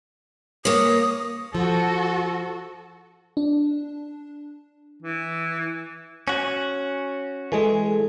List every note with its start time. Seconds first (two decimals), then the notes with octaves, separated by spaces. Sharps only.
0.65 A#3 C#5 D#6
1.55 F3 F#4 A4
3.37 D4
5.02 E3
6.28 C#4 F#4
7.52 E3 G#3 G#4 A4 G#5